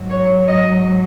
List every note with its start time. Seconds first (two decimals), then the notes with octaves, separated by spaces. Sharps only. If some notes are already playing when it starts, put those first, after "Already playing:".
Already playing: G#2 F#3
0.10 C#5
0.47 D#5